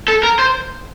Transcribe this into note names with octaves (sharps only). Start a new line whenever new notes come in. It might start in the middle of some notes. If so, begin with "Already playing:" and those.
A4
A#4
C5